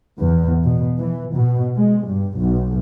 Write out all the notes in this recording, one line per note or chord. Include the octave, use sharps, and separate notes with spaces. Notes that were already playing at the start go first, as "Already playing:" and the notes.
E2
B2
E3
B2
G#3
G2
B1